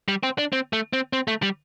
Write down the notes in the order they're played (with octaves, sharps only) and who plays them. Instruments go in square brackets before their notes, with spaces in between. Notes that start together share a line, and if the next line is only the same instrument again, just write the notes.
[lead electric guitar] G3
C4
D4
C4
A3
C4
C4
A3
G3